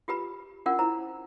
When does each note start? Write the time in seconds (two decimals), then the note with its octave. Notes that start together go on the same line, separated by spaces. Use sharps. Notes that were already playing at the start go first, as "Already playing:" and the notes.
0.08 F4 G4 B4 B5
0.66 C#4 D4 F4 A#4 F#5
0.79 E4 C5 A#5